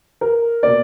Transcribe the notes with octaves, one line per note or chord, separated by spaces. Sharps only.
A#4
B2 A#3 D5